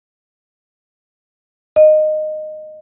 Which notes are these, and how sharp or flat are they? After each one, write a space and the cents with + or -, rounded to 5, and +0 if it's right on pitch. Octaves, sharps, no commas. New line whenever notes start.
D#5 -15